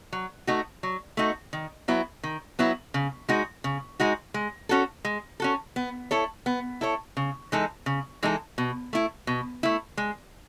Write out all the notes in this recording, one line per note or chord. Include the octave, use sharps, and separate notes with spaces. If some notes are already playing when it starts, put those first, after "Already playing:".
F#3
A3 D#4 F#4
F#3
A3 D#4 F#4
D#3
F#3 B3 E4
D#3
F#3 B3 E4
C#3
G#3 D#4 F#4
C#3
G#3 D#4 F#4
G#3
C#4 F#4 A4
G#3
C#4 F#4 A4
B3
E4 A4 C#5
B3
E4 A4 C#5
C#3
E3 G#3 D#4 A4
C#3
E3 G#3 D#4 A4
B2
A3 E4
B2
A3 E4
G#3